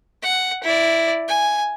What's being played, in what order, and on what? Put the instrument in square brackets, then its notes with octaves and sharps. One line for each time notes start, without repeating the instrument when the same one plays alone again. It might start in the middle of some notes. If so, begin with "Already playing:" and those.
[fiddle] F#5
E4 D5
G#5